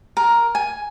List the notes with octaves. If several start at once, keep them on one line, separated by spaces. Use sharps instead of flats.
A#4
G#5